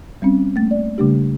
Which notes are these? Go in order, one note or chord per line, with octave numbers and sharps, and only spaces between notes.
G3 C4 C#4
A3 A#3 A6
D5
C#3 G3 A3 D4 G4